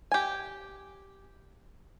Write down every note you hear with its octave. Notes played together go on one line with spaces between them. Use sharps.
G4 G#5